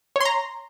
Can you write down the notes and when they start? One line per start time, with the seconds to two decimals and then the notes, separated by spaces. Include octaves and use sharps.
0.16 C#5
0.21 C6
0.25 A#5